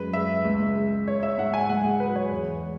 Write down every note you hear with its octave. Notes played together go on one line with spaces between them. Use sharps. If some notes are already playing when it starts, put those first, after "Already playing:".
Already playing: F#2 G#3 B4
G#3 E5
C#2
G#3
G#3 C#5
E5
G#2 F#5
G#5
C#2 F#5
G#4
F#3 B4
C#5
E2
G#3